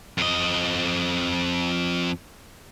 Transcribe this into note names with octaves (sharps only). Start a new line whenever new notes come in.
F2 D#5